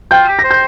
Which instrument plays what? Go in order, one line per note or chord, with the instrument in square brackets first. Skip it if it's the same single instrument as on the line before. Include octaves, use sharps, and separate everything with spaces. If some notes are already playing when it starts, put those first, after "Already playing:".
[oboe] F4 [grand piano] G5 G6
[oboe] G4
[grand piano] A#6
[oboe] C5
[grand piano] G6